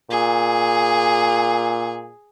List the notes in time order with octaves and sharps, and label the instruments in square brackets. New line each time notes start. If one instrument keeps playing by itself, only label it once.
[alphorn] A#2 [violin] G#4